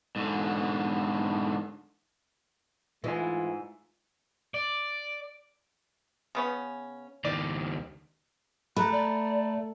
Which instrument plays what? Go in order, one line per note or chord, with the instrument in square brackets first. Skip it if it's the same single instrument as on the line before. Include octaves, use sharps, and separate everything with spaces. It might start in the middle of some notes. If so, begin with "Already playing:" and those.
[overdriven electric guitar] G#2 D3
[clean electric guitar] G#2 D#5 G#5 [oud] E3 [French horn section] A3 F4
[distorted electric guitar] D5
[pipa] C#3 B3 C#4
[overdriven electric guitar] C#2 D#3 [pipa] D5
[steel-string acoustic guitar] A3 [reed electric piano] A#5 B5 [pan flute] F#6
[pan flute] D5